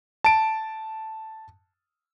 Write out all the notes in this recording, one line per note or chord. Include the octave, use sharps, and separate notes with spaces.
A5 D7